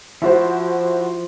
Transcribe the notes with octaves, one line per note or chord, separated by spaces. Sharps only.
F3 E4 F#4 C5